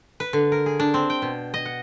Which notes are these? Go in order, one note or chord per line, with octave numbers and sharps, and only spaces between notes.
B4
D3
A#4
G#4
D4
C4
G5
B2
D#5
F#5